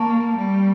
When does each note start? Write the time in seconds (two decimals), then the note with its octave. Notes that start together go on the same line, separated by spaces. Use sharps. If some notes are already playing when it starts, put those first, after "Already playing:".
Already playing: A#3 A5 C#6
0.37 G3